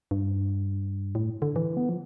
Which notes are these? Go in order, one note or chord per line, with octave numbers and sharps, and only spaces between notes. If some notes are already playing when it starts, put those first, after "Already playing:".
G2
A2
D3
E3
B3
F3